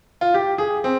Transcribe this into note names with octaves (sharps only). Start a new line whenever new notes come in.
F4
G4
G#4
C4